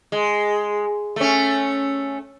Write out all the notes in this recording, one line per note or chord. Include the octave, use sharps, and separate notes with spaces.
G#3
A3 C#4